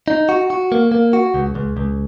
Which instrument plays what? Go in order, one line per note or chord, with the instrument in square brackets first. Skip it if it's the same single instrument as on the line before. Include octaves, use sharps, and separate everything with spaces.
[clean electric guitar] D#4
F#4
F#4
A#3
A#3
F#4
C#2
C#2
C#2